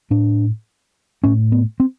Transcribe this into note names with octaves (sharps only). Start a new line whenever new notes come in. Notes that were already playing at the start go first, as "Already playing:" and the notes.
A2 D4
A2 C#4
B3
C4